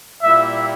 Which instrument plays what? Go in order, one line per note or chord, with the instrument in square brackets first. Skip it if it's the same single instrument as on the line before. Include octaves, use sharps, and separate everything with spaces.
[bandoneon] A#2 G3 A#3 E4 G4 [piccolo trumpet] E5